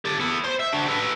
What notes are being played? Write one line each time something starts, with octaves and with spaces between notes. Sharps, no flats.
G4 A4
B3 E4
C5 C6
E5
D4 F#4
A4 B4